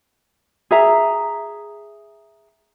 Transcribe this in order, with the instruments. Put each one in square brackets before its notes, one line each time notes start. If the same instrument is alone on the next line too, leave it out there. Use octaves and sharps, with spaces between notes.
[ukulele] G#4 E5 A#5